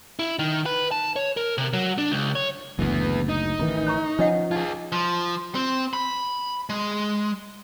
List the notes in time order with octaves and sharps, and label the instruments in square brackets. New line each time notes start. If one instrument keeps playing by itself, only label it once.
[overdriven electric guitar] E4
D#3
B4
A5
C#5
A#4
C3
F#3
D4
C#2
C#5
[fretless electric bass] F#1 D2 [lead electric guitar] E3 B3
[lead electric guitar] D#4
[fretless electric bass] A1 D#3 E3 [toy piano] E4
[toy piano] C#5 A#5 C#6
[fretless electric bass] F3 C#4 [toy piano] D4 D#5 F#5
[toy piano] D#4 [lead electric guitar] F4 G#4
[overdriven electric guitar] F3
C4
B5
G#3